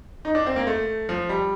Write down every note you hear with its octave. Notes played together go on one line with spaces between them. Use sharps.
D#4
D4
C4
A#3
A3
F3
G3